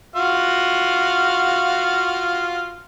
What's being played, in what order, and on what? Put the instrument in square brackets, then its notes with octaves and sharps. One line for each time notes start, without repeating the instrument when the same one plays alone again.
[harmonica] F4 F#4 F5